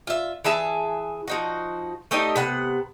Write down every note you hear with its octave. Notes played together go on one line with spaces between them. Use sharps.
F4 E5
E3 G#4 E5 A5
F3 D#4 F#4
A3 D#4 G4 D#5
C3 B3 F#5